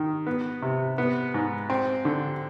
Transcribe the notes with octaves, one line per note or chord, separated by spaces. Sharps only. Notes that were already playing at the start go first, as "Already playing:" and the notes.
Already playing: D#3
B3
C3
B3
G#2
C4
D3